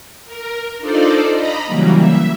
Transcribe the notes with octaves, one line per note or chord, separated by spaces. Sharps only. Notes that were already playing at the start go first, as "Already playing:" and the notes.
A#4
D4 D#4 F4 A4 C5 D5
D#5 A#5 B5
C#3 E3 F#3 G3 A#3
E5